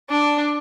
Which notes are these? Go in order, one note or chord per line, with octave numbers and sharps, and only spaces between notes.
D4